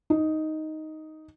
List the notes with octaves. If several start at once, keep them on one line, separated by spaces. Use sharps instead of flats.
D#4